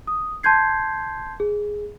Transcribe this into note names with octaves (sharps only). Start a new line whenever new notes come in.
D#6
A5 C6 G6 G#6 C7
G#4